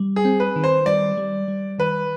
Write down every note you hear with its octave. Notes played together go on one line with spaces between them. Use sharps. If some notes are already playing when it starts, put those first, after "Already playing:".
Already playing: G3
G#4
C4
B4
D#3
C5
G3 D5
G3
G3
D#3 B4